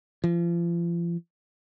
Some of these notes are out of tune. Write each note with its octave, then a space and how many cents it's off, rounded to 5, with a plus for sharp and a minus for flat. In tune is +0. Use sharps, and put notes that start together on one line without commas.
F3 -35